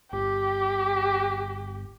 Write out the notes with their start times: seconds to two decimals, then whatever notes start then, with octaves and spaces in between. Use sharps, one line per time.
0.12 G1 G4